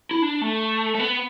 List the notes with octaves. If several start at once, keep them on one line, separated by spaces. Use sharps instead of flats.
E4
D4
A3
A3
B3